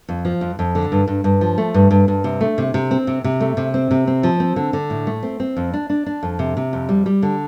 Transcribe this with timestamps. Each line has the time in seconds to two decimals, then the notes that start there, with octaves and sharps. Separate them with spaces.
0.09 F2
0.25 F3
0.41 F2
0.59 F2
0.75 D3
0.92 G2
1.08 G2
1.24 G2
1.41 F3
1.58 A3
1.74 G2
1.91 G2
2.08 G2
2.24 C3
2.41 A3
2.58 C3
2.74 C3
2.91 C4
3.07 C3
3.24 C3
3.40 A3
3.57 C3
3.74 C4
3.91 C3
4.07 C4
4.23 F3
4.40 C4
4.56 D3
4.73 D3
4.90 A2
5.07 A3
5.23 C4
5.40 C4
5.56 F2
5.73 D4
5.90 D4
6.06 D4
6.23 F2
6.39 C3
6.57 C3
6.73 F2
6.89 G3
7.06 G3
7.22 D3